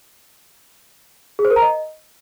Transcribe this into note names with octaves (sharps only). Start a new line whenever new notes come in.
G#4
C5
A#4
A#5
D#5